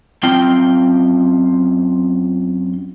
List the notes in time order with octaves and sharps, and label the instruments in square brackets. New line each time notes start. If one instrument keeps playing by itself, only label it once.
[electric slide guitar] F#2 C4 F4 G5